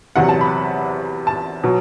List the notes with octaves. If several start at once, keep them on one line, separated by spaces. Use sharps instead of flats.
E2 C3 F#3 F#5
A5
B5
A5
B2 F#3